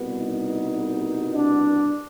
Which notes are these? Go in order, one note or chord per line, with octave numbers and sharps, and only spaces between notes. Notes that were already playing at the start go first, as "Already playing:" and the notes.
Already playing: C2 B2 G3 B3
D#4
D4